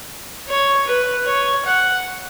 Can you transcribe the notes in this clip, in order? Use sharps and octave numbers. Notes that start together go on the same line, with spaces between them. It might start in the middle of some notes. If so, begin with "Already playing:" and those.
C#5
B4
C#5
F#5